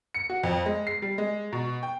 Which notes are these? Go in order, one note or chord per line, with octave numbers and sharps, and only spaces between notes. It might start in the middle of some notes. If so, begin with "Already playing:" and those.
C#7
F#4
F2
G#3
C7
G3
G#3
B2
G5